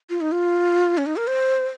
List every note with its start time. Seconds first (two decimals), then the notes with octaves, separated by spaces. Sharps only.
0.10 F4
0.21 D#4
0.32 F4
0.98 C#4
1.06 D#4
1.17 A#4
1.27 C5